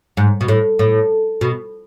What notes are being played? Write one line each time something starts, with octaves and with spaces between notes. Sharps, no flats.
G#2
B2
A2
A2
B2